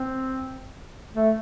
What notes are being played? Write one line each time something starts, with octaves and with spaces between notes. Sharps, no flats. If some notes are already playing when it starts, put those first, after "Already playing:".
Already playing: C4
A3